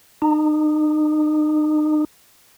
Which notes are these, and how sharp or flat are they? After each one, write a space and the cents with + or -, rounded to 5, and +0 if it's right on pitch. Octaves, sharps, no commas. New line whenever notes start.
D#4 -35